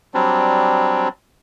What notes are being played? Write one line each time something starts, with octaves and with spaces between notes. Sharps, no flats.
F#3 G3 C4 D4